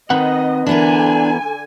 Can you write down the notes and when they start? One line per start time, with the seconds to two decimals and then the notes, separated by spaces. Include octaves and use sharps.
0.10 D#3 C4 B4 D#5 F#5
0.67 D3 E3 B3 D4 A#4 G#5